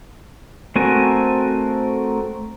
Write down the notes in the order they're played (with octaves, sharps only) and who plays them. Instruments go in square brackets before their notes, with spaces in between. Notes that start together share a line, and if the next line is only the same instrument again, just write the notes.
[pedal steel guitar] A3 C4 F#4 A#4 G#5